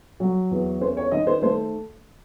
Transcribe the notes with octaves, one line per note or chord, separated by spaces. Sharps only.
F#3
E2
C#4 C5
C#5
D#3 D#5
C5
A3 C5